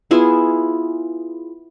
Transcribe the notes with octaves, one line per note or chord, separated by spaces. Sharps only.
B3 E4 F4 G#4